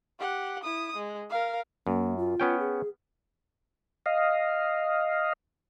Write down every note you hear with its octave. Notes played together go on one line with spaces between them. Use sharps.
G4 F#5
E4 D#6
G#3
A#4 F5
F#2 A#3
F4
B3 C#4 G5
G#4
D#5 F5